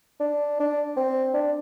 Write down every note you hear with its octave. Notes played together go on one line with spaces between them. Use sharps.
D4
D4
C4
D4